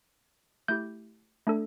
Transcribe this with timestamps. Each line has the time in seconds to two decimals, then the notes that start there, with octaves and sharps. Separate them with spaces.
0.68 A3 E4 G4 G6
1.47 A3 D4 A4